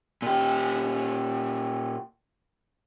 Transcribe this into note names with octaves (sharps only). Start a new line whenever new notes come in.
A#2 G4